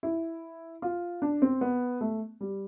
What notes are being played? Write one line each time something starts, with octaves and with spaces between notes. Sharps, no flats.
E4
F4
D4
C4
B3
A3
G3